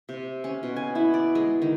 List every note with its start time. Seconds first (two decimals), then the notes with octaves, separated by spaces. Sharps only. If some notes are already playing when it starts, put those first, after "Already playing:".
0.09 C3
0.44 C#4
0.63 B2
0.76 G#5
0.95 E4
1.14 D5
1.35 G#3
1.62 D#3